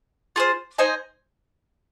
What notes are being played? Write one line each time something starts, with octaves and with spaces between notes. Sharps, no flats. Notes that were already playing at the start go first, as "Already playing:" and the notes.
F4 G#4 C5
D#4 C5 D#5 G#5